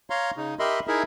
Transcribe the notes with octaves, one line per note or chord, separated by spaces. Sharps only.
C#5 F5 A#5 C6
C#3 D#4
G4 A#4 D#5 E5 B5 C6
D#4 E4 G#4 A#4 E5